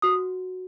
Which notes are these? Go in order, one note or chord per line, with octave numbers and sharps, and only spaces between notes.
F#4 D#6